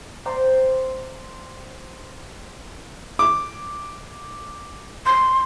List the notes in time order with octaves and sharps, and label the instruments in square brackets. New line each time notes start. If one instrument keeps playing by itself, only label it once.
[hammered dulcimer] C5 D5 G5 A#5
[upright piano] D6
[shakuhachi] C6